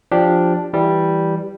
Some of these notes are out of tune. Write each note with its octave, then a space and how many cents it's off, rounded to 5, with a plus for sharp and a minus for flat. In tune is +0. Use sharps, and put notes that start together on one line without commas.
F3 +0 D4 +0 G4 +0
E3 +0 G3 +0